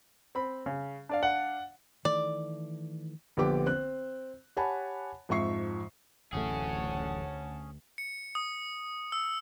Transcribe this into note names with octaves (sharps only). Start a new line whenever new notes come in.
C4 B5
C#3
D4 D5 F5
F#5
D#3 E3 A3 D5
A#1 D3 B3 G4 D6
C4 F#6
G4 C#5 F#5 G#5 A5 B5
F2 G#2 F3 E5 C#6 C7
D1 A1 D2 A3 C#4 G#4 F#5 A5
C#7
D#6
E6